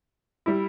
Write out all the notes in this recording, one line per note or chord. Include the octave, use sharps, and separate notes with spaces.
G3 E4